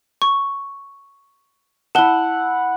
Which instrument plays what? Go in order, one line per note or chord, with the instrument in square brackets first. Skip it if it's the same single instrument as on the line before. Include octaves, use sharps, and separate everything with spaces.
[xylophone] C#6
[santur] E4 F#5 [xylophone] A5 G7